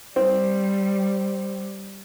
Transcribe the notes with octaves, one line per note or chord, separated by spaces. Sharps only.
G3 C4